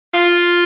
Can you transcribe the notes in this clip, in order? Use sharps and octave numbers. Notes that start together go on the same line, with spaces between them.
F4